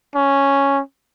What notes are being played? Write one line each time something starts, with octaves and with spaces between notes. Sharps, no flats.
C#4